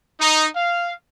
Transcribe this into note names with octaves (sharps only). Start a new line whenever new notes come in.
D#4
F5